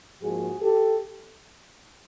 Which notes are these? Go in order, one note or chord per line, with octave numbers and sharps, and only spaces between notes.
G#2 F3 A#3 F#4 G#4
G4 A4